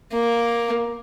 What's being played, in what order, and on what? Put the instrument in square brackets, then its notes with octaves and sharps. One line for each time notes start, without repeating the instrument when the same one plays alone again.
[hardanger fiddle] A#3